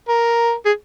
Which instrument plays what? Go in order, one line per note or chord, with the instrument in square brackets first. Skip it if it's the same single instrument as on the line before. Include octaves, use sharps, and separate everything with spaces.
[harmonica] A#4
G#4